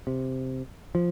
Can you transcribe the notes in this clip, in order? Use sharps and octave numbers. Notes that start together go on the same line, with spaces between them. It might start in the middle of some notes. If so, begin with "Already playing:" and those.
C3
F3